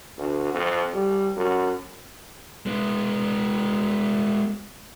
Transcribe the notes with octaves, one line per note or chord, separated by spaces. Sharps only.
D2
F2
G3
F#2
G#3 B3